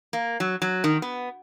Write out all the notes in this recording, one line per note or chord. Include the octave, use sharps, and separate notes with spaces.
A#3
F#3
F#3
D#3
B3